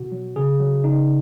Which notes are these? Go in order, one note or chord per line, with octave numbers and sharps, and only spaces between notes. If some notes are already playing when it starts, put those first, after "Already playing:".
Already playing: B2 F#4
F#3
C#3 G#4
F#3
C#3 D#4